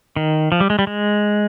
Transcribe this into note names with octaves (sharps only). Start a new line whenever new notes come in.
D#3
F3
G3
G#3
G3
G#3